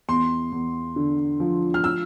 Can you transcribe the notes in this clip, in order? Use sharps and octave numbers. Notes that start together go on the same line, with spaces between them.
E2 C6
E2
D3
F3
F6
E6